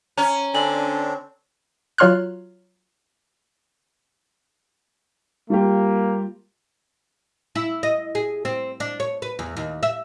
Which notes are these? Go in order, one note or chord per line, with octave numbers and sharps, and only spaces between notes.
C#4 A#5
D3 C4 D4 G#5 F#7
F#3 F4 C#5 C6 F6 F#6
G3 A#3 F4 G4
E4
D#5
G#4
C4
D4
C#5
B4
E2
D#2
E5